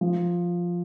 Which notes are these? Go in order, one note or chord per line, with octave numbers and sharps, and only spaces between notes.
F3